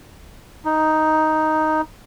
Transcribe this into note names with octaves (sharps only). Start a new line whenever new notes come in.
D#4